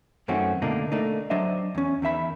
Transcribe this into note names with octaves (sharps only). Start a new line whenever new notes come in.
F#2 D#3 A3 C4 C#4 F#4
B2 D3 A3 A#3 D4 D#4
A3 A#3 D4 D#4
F#3 D4 C5 D#5 E5
E2 C#4
E2 D#3 E5 B5